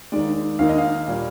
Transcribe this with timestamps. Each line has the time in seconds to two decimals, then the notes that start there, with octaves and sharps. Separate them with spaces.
0.12 D#2 D#3 G#3 D5
0.59 D#2 D#3 A#3 D#4 F5
0.69 D#5
0.78 F5
1.08 A#2 G3